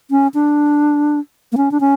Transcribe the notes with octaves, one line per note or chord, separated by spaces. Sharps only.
C#4
D4
A#3
C#4
D4
C#4